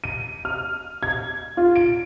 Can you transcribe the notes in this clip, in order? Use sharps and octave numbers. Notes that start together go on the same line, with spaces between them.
D#7
F6
G#6
F4
D7